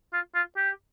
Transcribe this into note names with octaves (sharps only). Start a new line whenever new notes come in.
F4
F4
G4